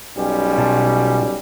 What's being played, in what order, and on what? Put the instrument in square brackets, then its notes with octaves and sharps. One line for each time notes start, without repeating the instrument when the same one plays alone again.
[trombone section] B1 G3 C#4
[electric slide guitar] B2 F4 A5